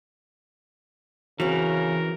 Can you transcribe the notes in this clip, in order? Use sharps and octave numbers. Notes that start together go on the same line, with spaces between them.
C#3 E3 C4 F#4 A#4